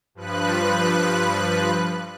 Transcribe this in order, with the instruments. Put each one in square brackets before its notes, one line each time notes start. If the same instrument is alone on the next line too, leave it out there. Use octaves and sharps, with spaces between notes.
[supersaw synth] G2 F3 B4 F#6